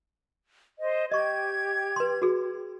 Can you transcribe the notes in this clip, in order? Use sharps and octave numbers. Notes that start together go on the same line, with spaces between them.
C5 D#5
G4 D#5 C#6 G#6
B4 C6
F#4 G#4